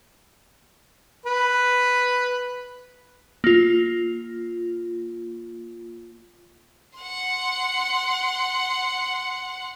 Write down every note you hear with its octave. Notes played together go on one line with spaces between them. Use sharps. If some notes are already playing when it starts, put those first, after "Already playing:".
B4
A#3 F4
F#5 C6